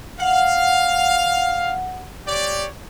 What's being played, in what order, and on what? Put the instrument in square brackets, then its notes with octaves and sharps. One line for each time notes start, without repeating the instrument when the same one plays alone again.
[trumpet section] F5 [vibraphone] F#5
[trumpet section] G4 C#5 D5